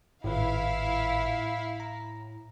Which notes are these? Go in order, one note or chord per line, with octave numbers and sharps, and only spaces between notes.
G#1 A2 E4 F4 B4 F5
A#5